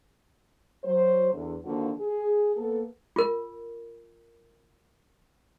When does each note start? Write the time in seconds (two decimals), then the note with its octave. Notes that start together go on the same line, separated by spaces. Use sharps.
0.84 F#3 C5
1.32 E2 D3
1.64 D3 D#3 F3 A#3 F#4
1.99 G#4
2.56 A#3 B3 A4
3.16 F4 A#4